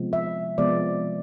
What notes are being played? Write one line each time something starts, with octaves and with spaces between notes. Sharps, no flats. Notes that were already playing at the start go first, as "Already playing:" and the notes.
Already playing: C3 F3 G#3 B3
E5
C3 F3 G#3 B3 D5